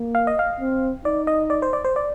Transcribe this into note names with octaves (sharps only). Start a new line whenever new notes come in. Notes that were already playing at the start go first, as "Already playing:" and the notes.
Already playing: A#3
F5
D#5
F5
C4
D#4 D5
D#5
D5
C5
D5
C5
D5